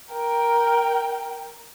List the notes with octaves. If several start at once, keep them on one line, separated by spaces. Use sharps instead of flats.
A#4 G5